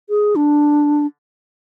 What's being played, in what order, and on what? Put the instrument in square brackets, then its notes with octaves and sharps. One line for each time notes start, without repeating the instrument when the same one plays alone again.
[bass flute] G#4
D4